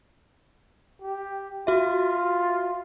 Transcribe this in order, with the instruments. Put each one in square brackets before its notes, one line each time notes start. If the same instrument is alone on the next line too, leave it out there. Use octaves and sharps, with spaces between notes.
[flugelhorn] G4
[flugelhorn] F4 [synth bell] F#4 E5